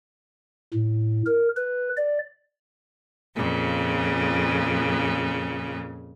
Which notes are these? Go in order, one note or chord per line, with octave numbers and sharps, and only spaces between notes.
A2
A#4
B4
D5
F2 A#2 C#3